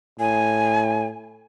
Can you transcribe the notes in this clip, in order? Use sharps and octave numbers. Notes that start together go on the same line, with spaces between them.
A2 G#5